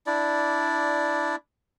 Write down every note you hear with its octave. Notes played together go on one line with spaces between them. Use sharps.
D4 E4 D5